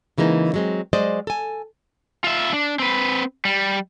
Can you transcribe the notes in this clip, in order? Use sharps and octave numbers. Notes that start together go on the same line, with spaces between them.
C#3 E3 G#3 A#3 D#4
F#3 G#3 C4
F#3 G#3 C5 D5 D#5
A4 G#5
F4 E5
D4
C4 B4
G3